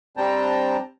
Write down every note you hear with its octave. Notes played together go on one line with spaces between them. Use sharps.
G3 C4 D4 G5 A5 A#5